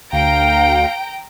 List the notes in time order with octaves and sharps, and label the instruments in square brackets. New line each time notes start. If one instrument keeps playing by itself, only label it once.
[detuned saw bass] D2 [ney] F5 [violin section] G5 A#5 D7